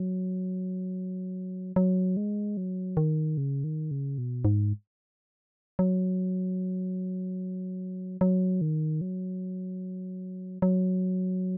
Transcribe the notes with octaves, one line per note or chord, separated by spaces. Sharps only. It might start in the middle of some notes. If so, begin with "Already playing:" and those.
Already playing: F#3
F#3
G#3
F#3
D#3
C#3
D#3
C#3
B2
G#2
F#3
F#3
D#3
F#3
F#3